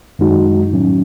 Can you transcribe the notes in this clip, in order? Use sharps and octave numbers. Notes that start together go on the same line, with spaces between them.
F#2 D#3 G#3 D#4 F#4
A2 F#3 C#4